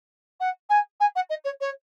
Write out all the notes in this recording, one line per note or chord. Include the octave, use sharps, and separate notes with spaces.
F#5
G#5
G#5
F#5
D#5
C#5
C#5